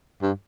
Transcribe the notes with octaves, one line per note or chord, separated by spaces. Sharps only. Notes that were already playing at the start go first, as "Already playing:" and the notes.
G2